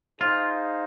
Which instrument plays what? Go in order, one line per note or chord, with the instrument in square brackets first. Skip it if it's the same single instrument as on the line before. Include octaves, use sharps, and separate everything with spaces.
[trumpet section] D#4 G#4 C5 F5 [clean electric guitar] F4